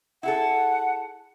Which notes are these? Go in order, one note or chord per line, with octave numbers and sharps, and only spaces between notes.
E4 G#4 A4 F#5